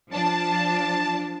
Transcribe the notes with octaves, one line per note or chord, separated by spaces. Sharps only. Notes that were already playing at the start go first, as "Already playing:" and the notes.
F3 D4 A5